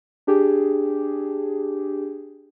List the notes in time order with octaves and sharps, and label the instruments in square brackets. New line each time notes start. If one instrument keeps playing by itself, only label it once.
[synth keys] D4 G4 G#4